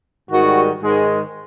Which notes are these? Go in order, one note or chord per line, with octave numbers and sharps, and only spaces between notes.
G#2 D#3 G3 F#4
G#2 D#3 G#3